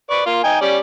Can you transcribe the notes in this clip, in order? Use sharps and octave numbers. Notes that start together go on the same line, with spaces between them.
B4 D5 C#6
A#3 F4
D#4 G5 G#5
G3 C#4 D5